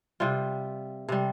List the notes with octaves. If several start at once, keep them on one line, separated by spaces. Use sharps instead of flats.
C3 G3 F4
C3 G3